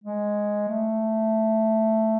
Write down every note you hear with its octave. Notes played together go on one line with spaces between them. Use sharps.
G#3
A3